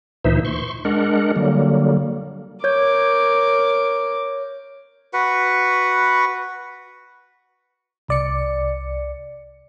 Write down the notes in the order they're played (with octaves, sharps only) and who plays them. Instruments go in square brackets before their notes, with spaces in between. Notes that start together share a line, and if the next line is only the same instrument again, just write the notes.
[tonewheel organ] D2 A#2 E3 D#4 C5 E5
C6 C#6
G#3 D4 A#4 F#5
D3 F#3 G3 A#3
[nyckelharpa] A#4 D6 [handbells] C#5 G6
[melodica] F#4 B4 F#5
[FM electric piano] C2 D5 C#7